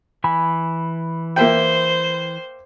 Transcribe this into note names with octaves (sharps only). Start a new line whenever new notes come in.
E3 G#5 B5
A#3 C5 E5 G5